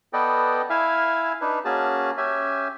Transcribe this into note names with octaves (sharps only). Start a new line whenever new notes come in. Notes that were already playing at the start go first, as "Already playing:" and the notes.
B3 A4 B4 D5 D#5 G5
E4 E5 F5 G#5
D4 D#4 B4
A#3 C#4 F#4 G#4 A5
C#4 G4 E5 G#5